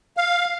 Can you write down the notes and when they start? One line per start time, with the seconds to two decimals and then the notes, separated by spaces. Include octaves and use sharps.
0.17 F5